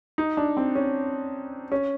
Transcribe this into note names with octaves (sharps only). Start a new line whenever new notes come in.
D#4
D4
C4
C#4
C#4